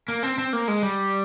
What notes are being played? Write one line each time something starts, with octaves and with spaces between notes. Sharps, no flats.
A#3
C4
C4
A#3
G#3
G3